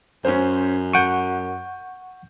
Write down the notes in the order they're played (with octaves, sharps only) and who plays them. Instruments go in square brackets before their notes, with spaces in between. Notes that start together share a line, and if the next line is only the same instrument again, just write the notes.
[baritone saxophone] F#2 [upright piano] C#4 C5
[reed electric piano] F#5 C#6 [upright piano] G6 D7 D#7